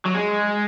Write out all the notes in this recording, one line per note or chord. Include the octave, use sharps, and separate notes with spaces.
F#3
G#3